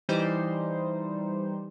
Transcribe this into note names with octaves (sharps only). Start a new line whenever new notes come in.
E3 G3 D#4 C5